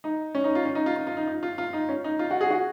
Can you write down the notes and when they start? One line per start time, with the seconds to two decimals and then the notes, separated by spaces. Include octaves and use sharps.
0.04 D#4
0.35 C#4
0.44 D#4
0.55 F4
0.65 C#4
0.75 D#4
0.86 F4
0.96 F4
1.07 F4
1.17 D#4
1.27 D#4
1.43 F4
1.58 F4
1.73 D#4
1.89 C#4
2.04 D#4
2.19 F4
2.31 F#4
2.41 G#4
2.51 F#4